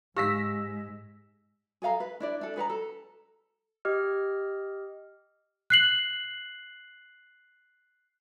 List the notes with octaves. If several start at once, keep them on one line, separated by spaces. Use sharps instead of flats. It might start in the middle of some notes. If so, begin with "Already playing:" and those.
G#2 G#3 G4 F5 E6 A#6 B6
G#4 A4 F5 A#5
B4
D4 E4 D5
D4 A4
G#4 B4 F#5 A#5
A4
G4 D#5 F6
F#6 C7 F#7